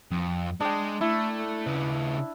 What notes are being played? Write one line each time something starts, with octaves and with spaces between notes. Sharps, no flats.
F2
G#3 D4 G5
A3 E4
C#3 B4